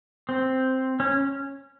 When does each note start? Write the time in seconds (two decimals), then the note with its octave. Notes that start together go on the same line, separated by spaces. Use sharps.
0.29 C4
1.00 C#4